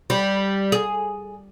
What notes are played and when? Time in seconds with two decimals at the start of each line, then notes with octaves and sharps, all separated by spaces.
0.10 G3
0.72 G#4